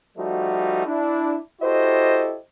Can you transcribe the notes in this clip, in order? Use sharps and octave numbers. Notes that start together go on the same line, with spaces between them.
F3 G3 A3 D#4 F#4
D4 E4
E4 F#4 G4 A4 C5 D#5